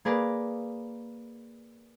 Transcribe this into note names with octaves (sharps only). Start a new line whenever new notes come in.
A#3 G#4 A#4 B4 D5